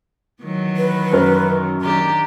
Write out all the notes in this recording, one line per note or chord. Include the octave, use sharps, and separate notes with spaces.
D#3 E3 F#3
B4
F#2 A#4
D#3 D4 G4 A#5